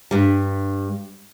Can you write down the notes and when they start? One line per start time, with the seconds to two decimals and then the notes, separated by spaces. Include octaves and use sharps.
0.11 G2 G3